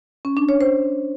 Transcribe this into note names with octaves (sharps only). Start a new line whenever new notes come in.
C#4
D4
C#5
C5